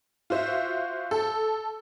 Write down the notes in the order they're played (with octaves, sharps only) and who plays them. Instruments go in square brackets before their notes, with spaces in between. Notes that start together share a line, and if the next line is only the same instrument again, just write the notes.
[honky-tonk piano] F4 F#4 C5 E5
A4